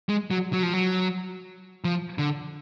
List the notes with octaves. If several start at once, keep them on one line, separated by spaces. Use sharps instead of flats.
G#3
F#3
F#3
F3
F#3
F3
D3